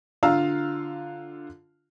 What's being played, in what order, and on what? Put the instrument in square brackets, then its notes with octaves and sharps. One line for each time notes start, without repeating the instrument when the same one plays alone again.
[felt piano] D3 F4 F5 A#5 E6